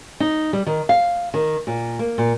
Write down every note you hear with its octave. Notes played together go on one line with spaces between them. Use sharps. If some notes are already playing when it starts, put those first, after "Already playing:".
D#4
G3
D#3
F5
D#3
A#2
A#3
A#2